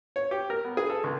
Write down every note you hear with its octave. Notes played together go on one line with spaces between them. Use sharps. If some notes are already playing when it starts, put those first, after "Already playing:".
C#5
G4
A#4
B3
G#4
A4
C#2